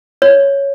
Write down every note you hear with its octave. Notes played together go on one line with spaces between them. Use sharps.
C#5